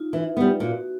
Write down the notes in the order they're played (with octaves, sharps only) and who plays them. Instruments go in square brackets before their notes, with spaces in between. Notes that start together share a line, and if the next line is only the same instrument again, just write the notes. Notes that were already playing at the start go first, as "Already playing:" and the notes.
Already playing: [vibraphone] D#4 F4
[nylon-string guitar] E3
G3 B3
[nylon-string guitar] A#2 [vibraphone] F#4